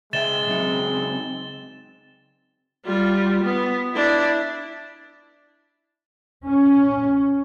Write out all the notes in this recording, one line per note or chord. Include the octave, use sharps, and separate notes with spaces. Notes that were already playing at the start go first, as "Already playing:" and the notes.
C#3 G#3 C#5 E5 G5 A6 E7 G7
C#3 F#3 C4 D#4
G3 F4
B3
D4 E4
C#4